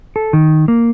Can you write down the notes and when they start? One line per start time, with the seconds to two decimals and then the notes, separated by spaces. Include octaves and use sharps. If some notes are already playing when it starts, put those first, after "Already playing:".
0.16 A4
0.33 D#3
0.68 A#3